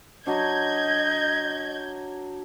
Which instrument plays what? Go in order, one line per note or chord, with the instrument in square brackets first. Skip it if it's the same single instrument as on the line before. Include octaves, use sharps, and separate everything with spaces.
[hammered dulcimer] F#3 D4 [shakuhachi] D#5 [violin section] G6 G#6